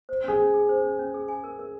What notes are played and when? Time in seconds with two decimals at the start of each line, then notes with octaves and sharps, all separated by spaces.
0.09 C5
0.24 C#4 G#4
0.39 C#4
0.54 G#4
0.69 C5
0.84 C#4
0.99 C#4
1.14 G#4
1.28 G#5
1.44 A#4
1.59 A#4